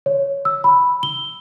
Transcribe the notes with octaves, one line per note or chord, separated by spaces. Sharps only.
C#5
E6
B5
G7